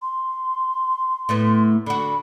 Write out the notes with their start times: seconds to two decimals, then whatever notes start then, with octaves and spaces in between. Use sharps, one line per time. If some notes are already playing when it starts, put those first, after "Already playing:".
0.02 C6
1.29 A2 A3 B3
1.86 D3 F#4 B5